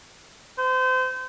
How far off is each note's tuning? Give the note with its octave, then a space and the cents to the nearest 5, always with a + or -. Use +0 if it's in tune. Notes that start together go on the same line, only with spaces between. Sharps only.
C5 -30